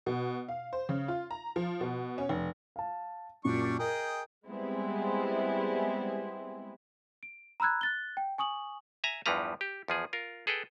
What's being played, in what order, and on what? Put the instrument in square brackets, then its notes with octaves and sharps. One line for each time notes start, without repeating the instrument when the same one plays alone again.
[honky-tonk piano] B2
F5
C5
C#3
F4
A#5
F3
B2
C#4
F1
[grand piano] F5 A5
[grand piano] F#2 A#2 [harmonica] G3 D4 C#6
[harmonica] G#4 D#5 G5 [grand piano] A#4
[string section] G3 G#3 B3 C4 E4 G#4
[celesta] D7
A#5 B5 E6 F#6 G#6
F#6 A6 G7
G5
G#5 C#6 D#6 F#7
[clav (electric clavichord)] E5 G#5 A#5
E2 G2 E3 F3 B4 A#5
G4
E2 F3 G#4
F4 A#4
G#4 A4 B4 G5